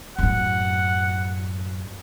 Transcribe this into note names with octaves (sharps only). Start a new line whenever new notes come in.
F#2 A2 F#5